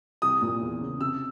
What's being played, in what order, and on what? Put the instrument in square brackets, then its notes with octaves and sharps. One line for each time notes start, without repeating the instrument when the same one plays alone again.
[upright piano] C2 [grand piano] D#6
[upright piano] A#2
E2
C#3
[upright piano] C3 [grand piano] E6